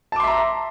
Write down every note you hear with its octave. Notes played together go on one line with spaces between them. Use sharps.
E5 A5 A#5 C6 D6